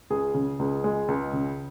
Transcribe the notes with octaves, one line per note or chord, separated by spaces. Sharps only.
C#2 G#4
C#3
C#2
G#3
C#2
C#3